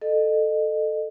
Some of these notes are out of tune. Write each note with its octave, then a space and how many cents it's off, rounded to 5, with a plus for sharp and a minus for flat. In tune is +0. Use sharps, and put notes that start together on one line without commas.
A4 +0 D#5 -30